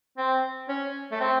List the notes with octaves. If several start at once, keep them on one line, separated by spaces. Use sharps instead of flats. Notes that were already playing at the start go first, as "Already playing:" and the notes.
C4
C#4
A3
C4